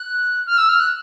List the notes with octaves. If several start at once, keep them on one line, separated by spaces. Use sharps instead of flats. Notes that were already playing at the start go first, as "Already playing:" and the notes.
Already playing: F#6
F6
E6
F6
F#6